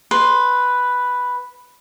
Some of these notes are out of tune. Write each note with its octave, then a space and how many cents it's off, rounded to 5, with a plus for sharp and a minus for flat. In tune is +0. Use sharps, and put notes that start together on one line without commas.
B4 +0 C6 +0